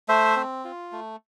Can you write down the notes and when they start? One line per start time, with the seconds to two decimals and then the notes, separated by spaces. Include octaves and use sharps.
0.08 A3 C5 E5
0.36 C4
0.65 F4
0.92 A3